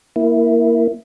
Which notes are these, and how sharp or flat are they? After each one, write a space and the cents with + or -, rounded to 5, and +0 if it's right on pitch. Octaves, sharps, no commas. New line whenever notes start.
A#3 +0 E4 +0